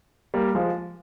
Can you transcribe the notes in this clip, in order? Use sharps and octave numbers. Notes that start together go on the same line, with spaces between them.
G3 A#3
F3 G#3